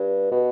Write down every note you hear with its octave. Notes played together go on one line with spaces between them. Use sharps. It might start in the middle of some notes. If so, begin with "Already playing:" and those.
Already playing: G2
B2